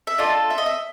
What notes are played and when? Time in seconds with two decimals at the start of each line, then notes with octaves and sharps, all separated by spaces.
0.07 E5
0.18 D4 F4 A4 D#5
0.50 E5
0.58 D#5
0.66 E5